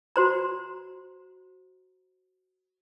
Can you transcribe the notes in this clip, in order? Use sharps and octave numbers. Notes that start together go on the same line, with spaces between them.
F#4 C5 A#5